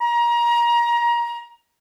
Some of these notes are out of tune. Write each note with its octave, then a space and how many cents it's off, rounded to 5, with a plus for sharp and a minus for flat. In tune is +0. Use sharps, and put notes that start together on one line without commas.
A#5 +25